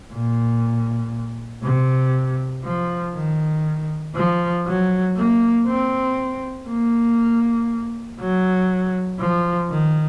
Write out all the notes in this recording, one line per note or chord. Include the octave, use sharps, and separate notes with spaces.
A#2
C3
F3
D#3
F3
F#3
A#3
C4
A#3
F#3
F3
D#3